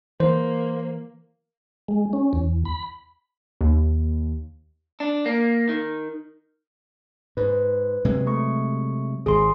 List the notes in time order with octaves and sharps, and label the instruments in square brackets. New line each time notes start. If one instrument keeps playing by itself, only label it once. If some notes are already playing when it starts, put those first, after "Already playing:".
[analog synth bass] E3 [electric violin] A#3 [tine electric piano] C5
[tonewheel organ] G#3
C#4
E2
B5
[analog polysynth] D#2
[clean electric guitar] D4
A#3
D#3
[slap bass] G#2 [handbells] B4
[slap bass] C3 F#3 G#3
[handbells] A3 C#6
[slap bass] G#1 [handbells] G#4 C6